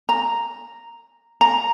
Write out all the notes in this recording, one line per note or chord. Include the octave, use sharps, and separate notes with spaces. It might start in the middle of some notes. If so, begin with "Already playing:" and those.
A#5
A#5